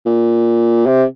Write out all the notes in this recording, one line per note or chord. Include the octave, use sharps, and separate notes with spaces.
A#2
C3